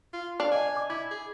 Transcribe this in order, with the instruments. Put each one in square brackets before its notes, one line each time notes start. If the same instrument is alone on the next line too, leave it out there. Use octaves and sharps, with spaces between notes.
[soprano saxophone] F4
[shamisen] D4 [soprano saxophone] F5
[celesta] D5 D#5 [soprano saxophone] G#5
[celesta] D6
[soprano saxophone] E4 [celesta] D6 G#6
[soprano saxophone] G#4